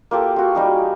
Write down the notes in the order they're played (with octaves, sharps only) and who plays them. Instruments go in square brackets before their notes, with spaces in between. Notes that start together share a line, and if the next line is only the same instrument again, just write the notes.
[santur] A#3 F4 G4 A4
F4 F#4
G3 D#4 G#4